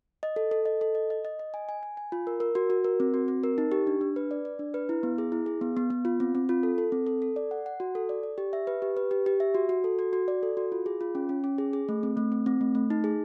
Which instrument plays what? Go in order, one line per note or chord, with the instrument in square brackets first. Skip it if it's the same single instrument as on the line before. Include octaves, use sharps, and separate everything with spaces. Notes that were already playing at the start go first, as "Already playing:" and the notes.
[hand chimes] D#5
A4
A4
D#5
A4
D#5
D#5
D#5
D#5
G#5
G#5
G#5
G#5
F4
A#4
A#4
F#4
F#4
A#4
C4
F#4
C4
A#4
D#4
G4
D4
D4
B4
D5
D5
D4
B4
E4
B3
G#4
E4
G#4
B3
B3
B3
F4
C4
C4
F4
A4
A4
C4
A4
A4
D5
F#5
F#5
F#4
A4
D5
D5
G4
E5
B4
G4
B4
G4
G4
E5
F#4
F#4
A4
F#4
F#4
D5
A4
F#4
F4
G#4
F4
C#4
C#4
C#4
G#4
G#4
A3
C4
A3
C4
C4
A3
A3
D#4
G#4